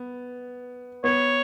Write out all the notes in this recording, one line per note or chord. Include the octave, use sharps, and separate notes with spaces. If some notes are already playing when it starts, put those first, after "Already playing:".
Already playing: B3
B3 C#5